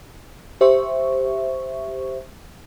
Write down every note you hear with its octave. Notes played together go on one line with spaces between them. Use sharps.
G4 C5 E5 C#6